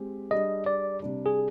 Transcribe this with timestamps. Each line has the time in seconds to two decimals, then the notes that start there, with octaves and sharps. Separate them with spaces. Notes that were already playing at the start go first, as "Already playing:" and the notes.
Already playing: G#3 C4 G4
0.30 G3 D4 G#4 D#5
0.66 D5
1.02 C3 G3 D4
1.26 G#4